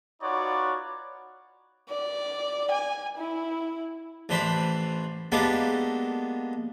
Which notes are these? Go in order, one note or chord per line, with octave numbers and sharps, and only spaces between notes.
D#4 F4 F#4 B4 C#5 D5
D5
G#5
E4
A1 E3 D4 C5 B5
G#3 A#3 B3 D4 G4 A4